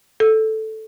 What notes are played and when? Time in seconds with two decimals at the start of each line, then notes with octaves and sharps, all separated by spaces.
0.20 A4